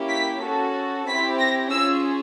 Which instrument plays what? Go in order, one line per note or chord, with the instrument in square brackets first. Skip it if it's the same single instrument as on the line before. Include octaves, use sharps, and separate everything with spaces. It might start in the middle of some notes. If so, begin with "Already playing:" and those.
Already playing: [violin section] A#3 C#4 E4 G4
B6
C#4 F#4 A4
C4 E4 G4 B6
A#6
C#4 F4 G#4 E6